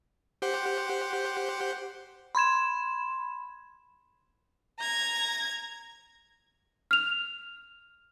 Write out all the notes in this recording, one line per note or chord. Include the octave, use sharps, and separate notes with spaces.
G4 C5 F#5
B5 C6 G#6 E7
A#5 G#6
F6 F7